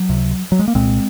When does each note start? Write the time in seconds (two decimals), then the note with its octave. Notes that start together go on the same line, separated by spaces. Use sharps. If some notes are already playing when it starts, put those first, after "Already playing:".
Already playing: F#3
0.09 C#2 C3
0.52 F#3
0.59 G#3
0.68 A#3
0.75 C2 A#2 G#3 C4